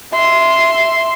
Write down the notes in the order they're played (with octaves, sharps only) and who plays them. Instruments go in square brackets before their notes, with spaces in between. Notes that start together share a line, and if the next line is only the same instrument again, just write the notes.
[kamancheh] E5 C6